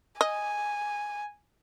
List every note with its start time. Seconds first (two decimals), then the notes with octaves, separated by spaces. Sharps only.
0.21 D#5 G#5